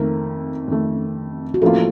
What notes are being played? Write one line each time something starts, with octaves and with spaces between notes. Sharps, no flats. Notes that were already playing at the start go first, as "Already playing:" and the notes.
Already playing: F2 D#3 A3 A#4
F2 D#3 A3
F#4
A1 A2 F3 A#3 F4 A4